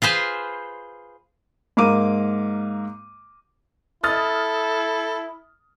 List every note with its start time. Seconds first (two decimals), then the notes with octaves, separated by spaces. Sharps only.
0.02 F4 G#4 B4 C5
1.77 G#2 A#3 F5 A#5 D6 D#7
4.04 E4 A4 D#6 F6 A6